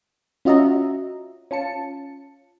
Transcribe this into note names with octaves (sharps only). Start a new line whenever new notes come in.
C#4 F4 F#4 D#5 E5 A#5
C#4 F4 A5 C#7